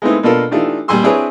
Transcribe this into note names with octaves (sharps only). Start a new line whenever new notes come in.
G#3 A3 B3 C4 D#4 E4
B2 A#3 D4 F4 A4 A#4
E3 A3 D4 D#4 F4 G4
A#1 G3 G4 G#5 C6 E6
C4 D4 E4 G#4 B4 C#5